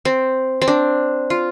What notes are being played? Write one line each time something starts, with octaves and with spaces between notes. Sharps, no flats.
C4
C4
D4
F4